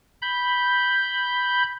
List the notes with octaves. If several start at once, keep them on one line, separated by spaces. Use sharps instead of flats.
B5 G6